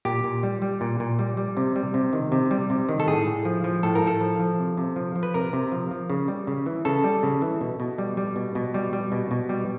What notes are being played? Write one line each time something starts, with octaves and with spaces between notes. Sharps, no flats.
A#2 G4
A#2
G3
G3
A#2
A#2
G3
G3
C3
G3
C3
D#3
C3
G3
C3
D#3
A4
A2 G#4
A2
F3
F3
A2 A4
A#4
A2
A4
F3
F3
C3
C3
F3
F3
B4
C3 A#4
C3
F3
F3
C#3
G3
C#3
E3
C#3 A4
G3
C#3
E3
B2
B2
G3
G3
B2
B2
G3
G3
B2
B2
G3